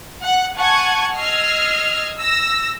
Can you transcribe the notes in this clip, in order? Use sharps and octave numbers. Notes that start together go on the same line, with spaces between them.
F#5
F#5 G#5 A5 C#6 G#6
D#5 E6 F6 G#6 C7
E6 A#6